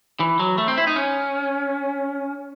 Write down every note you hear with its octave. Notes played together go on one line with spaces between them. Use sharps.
E3
F#3
A3
C4
E4
D#4
C#4